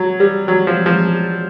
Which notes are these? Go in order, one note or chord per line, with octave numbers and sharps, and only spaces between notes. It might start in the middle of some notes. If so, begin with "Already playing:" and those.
Already playing: F#3
G3
F#3
F3
F3